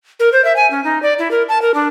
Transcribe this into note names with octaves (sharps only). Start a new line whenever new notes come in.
A#4
C5
E5
G#5
C#4
D#4
D5
E4
A#4
A5
A#4
D4